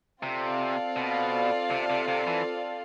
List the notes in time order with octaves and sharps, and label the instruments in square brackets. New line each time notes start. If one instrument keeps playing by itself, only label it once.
[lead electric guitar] C3 [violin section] C4 F4 A4 D5 F5
[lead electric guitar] B2
C3
C3
C3
E3